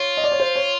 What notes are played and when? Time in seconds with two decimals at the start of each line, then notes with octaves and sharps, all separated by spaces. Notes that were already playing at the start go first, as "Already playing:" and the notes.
Already playing: F4 C#5
0.17 D#5
0.24 D5
0.32 C#5
0.40 C5
0.56 C#5